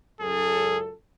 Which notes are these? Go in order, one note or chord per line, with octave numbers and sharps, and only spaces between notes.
C#2 F#2 G#4 A4